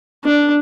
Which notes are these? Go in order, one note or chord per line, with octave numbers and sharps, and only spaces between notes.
D4